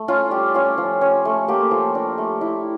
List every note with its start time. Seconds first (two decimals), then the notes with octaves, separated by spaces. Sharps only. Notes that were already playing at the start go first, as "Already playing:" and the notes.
Already playing: A3
0.08 C#4 F4
0.31 G3 G4
0.54 C#4 F4
0.78 F3
1.01 C#4
1.25 A3
1.48 A#3 G4
1.71 F3 A4
1.95 D4 A#4
2.18 A3
2.41 E4